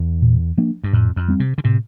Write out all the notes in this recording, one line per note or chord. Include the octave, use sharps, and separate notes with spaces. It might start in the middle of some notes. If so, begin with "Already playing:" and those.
Already playing: E2
A#2
F3 A#3 D4
G2
F2 A2
F2
G3 C4
C3
D3
A2 C3